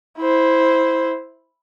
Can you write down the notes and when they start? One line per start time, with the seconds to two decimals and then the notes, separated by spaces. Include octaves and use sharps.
0.18 E4 C5